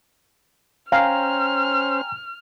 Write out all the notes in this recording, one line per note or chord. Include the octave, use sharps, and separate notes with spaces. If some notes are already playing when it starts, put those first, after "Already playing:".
C#4 C5 F5 G5 G#5 A#5 F6